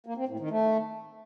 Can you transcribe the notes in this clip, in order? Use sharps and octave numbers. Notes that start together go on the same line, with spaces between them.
A#3
C4
A2
D#3
A3